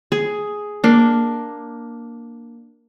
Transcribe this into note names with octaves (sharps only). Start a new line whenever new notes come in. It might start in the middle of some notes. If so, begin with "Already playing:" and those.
G#4
A#3 D4